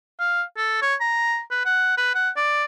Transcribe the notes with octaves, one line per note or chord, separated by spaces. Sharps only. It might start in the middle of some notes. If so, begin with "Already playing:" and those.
F5
A4
C#5
A#5
B4
F#5
B4
F#5
D5